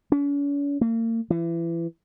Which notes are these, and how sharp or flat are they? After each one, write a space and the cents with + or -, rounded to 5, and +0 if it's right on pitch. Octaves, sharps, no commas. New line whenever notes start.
C#4 +45
A#3 -40
E3 +30